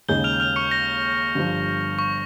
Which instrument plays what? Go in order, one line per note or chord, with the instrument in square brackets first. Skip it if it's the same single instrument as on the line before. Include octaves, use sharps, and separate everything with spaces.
[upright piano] D#2 C#3 G#3 D#4 G#4 [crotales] G6 G7
[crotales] F6 F7
F6 F7
C#6 C#7
A#6
[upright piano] G1 G2 F3
[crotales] C#6